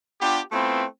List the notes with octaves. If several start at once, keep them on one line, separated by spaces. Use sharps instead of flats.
B3 D4 F4 G4
A3 B3 C4 E4 F4 B4